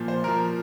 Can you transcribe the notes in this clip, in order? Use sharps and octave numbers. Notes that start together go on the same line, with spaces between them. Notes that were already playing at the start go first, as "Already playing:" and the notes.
Already playing: A#2 F3
C5
A#2 F3 A#4